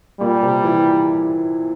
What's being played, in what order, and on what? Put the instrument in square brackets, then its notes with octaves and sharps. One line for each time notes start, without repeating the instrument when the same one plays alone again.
[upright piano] A#2 [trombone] G3
[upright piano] C3
E3